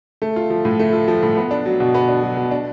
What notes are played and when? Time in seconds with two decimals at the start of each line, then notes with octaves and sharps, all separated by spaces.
0.22 A3
0.36 F4
0.50 F3
0.65 A2
0.79 A3
0.93 F4
1.08 F3
1.23 A2
1.37 B3
1.51 D4
1.66 F#3
1.80 B2
1.94 B3
2.09 D4
2.23 F#3
2.37 B2
2.51 D4